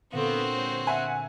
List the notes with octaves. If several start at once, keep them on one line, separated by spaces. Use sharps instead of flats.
A#2 D3 B3 C4 F#4
G#3 C5 C#5
E5 F#5 G#5